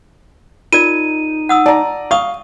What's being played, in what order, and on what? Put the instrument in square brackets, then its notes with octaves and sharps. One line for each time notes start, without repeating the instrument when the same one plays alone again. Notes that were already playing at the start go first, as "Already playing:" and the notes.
[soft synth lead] D#4 [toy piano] F4 A#4 D5 [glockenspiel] D#7
[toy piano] F#5 D#6 E6
[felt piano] D5 A#5 [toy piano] A5
[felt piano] F5 [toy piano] C#6 D#6